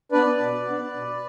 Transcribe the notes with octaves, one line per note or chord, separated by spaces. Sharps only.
B3 D4 B4 D5
B2
B3 D4
B2